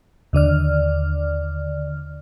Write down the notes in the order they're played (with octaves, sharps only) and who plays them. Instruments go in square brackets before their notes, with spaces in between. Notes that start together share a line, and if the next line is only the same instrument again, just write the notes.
[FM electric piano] D#2 D3 D5 F6